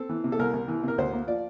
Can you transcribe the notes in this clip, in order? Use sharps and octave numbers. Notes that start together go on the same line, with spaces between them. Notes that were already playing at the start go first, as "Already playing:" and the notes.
Already playing: C4 A4
E3
C3
A4
C2 A#4
C2
E3
C3 A#4
D2 C5
A#3
F3 D5